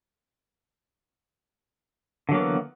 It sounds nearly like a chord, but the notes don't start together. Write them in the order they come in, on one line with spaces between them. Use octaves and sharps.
D3 F#3 A#3 B3 E3